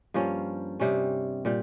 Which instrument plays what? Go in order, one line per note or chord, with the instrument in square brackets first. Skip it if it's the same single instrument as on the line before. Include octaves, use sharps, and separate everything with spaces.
[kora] G2 F3 A#3 C#4
C3 G3 C#4
A#2 G3